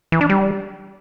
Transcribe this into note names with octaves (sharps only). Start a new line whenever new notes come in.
E3
D4
G3